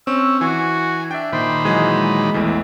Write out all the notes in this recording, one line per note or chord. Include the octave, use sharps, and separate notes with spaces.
C4 C#4 E6
E3 F#4 G#5
D4 E5 G5
A#2 D#3 C5 B5
E3 F#3 G#3
A1 E2 A2